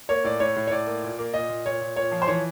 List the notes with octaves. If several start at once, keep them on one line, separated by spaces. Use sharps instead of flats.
A#3 C#5
A2 D5
A2 C#5
A2
C#5
A2 D5
A#3
A#2
A#3
A#2 D#5
A#2
A#2 C#5
A#2
A#2 C#5
F3
C5
E3 C#5